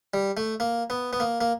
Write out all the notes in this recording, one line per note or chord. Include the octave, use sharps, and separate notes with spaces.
G3
A3
A#3
B3
B3
A#3
A#3